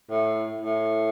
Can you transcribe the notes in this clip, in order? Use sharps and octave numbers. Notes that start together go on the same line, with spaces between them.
A2
A2